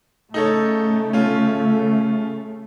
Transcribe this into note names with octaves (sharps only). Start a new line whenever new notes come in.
C#3 A3 D#4 A4 C#5
C#4 F4